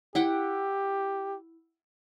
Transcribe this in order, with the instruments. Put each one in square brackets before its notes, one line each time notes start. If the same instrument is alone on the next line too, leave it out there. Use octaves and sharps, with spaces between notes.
[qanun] E4 F#5 G5 [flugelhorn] G4